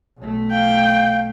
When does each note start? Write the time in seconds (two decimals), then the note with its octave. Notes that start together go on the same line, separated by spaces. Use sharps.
0.18 B1 A3
0.52 F5 G5